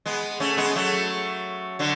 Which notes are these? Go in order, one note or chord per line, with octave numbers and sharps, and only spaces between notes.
G#3 B3
A3 C#4
G#3 B3
F#3 A3
D3 F#3